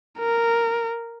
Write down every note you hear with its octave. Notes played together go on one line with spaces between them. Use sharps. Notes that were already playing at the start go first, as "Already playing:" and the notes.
A#4